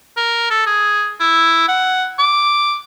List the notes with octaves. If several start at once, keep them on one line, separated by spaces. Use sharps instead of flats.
A#4
A4
G#4
E4
F#5
D6